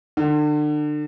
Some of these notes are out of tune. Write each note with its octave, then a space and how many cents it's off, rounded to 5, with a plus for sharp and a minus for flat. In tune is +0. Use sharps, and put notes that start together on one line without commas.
D3 +35